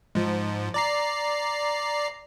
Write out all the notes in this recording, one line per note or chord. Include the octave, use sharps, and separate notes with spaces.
G#2 F3
D5 A#5 C7